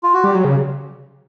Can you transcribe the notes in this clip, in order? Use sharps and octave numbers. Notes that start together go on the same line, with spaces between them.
F4
F#4
G3 G4
F#3
C#3